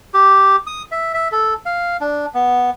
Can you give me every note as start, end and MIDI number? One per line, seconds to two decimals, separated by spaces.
0.14 0.56 67
0.67 0.83 87
0.92 1.14 76
1.14 1.28 76
1.32 1.54 69
1.66 1.97 77
2.01 2.26 62
2.34 2.70 59